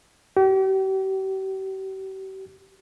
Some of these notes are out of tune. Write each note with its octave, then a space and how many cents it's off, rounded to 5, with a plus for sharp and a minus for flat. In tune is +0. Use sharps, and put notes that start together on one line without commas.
G4 -40